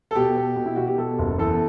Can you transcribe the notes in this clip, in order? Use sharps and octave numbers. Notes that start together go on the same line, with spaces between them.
A4
B2 G4
B2
B2
E4
B2 F#4
G4
B2 A4
F#1
E2 A4